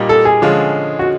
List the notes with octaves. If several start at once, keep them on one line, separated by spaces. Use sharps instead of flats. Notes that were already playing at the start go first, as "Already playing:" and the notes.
Already playing: A#2 G3 A#3 D#4
A4
G#4
D3 F3 G#3 C#4 F4
F#4